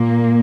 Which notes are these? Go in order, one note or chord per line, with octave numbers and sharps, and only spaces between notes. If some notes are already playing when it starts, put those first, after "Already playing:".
Already playing: A#2 A#3